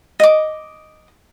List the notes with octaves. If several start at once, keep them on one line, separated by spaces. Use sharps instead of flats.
D#5 D6